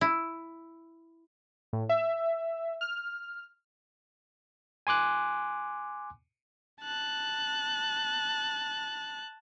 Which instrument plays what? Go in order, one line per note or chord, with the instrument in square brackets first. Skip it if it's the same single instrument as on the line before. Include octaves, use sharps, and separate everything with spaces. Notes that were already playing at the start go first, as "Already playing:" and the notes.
[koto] E4
[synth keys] A2
E5
F6
[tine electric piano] G#5 C6 D6 F#6
[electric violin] A5 F#6